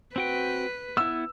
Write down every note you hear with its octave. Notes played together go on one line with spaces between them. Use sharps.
C4 F#4 B4 G5
B3 E4 E6